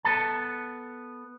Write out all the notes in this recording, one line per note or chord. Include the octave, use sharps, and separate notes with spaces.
B3 A4 A5